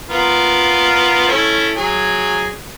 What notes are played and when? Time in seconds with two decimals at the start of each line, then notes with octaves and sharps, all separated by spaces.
0.09 B3 F4 A#4
1.28 A3 C#4 E4
1.76 F#3 G#4